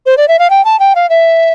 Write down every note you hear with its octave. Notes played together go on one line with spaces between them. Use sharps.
C5
D5
E5
F5
G5
A5
G5
F5
E5